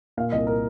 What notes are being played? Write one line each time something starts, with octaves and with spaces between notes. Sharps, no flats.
A#2 F5
C2 D#5
A#4